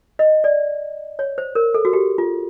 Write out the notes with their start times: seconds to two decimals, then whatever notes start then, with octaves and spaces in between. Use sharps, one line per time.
0.19 D#5
0.44 D5
1.19 C#5
1.38 C5
1.55 A#4
1.74 A4
1.85 F#4
1.93 G4
2.18 F4